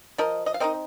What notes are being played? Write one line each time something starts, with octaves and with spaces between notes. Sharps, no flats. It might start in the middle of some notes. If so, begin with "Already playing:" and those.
F3 A#4 D#5
D#5
F5
C4 D#4 A#4 D#5